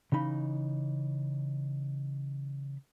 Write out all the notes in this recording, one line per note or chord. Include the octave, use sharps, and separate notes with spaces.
C#3 E3 D#4 B5